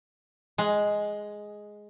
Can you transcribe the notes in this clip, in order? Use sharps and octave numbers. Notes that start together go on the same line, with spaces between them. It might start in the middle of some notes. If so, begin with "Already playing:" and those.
G#3